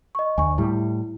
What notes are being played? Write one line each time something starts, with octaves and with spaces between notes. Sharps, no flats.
D#5 C#6
D2 G#5 C#6
A2 G3 E4